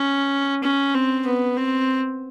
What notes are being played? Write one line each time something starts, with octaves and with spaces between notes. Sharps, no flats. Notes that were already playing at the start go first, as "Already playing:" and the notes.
Already playing: C#4
C#4
C4
B3
C4